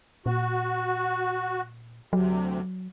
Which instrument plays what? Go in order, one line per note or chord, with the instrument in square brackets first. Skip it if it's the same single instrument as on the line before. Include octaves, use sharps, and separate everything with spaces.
[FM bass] A#2 [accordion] F#4
[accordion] D2 C3 [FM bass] F#3